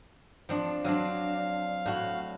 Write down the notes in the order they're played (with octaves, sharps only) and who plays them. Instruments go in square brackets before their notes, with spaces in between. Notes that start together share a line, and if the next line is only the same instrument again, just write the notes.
[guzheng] F3 C4 D4
[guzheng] F#3 C4 D4 [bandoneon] F5
[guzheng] A2 F#4